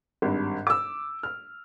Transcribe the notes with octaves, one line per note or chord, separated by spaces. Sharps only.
G#1 G2
D6 E6
F6